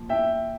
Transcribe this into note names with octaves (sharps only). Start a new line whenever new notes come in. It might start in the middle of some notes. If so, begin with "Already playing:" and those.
Already playing: A#2 F3
E5 G5